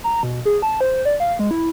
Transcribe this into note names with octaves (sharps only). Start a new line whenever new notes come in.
A#5
B2
G#4
A5
C5
D5
F5
G#3
E4